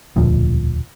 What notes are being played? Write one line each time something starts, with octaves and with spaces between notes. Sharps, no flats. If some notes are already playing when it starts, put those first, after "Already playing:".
E1 D2 A#2 F3